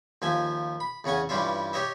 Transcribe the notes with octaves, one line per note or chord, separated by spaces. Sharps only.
D#2 F3 E5 G#5
B5
E2 C#3 C#4 F#5 G#5
G2 E3 G3 C#4 F4 E5
G4 C#5 D#5 E5